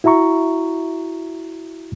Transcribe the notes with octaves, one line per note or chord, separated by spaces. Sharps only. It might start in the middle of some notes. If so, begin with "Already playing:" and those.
E4 F#4 E5 A#5 C#6